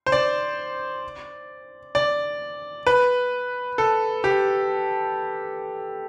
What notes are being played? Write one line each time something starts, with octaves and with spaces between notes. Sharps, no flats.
C5
D5
D5
B4
A4
G4